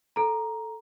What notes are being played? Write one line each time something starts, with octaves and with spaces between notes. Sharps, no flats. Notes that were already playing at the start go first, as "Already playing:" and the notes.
A4 A#5